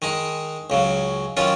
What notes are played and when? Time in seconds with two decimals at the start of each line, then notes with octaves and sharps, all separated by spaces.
0.02 D#3 G#3 D#4
0.70 C#2 C#3 F#3
1.37 D#3 F#3 C#4 F4